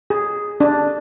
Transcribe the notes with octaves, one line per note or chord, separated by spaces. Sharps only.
G#4
D4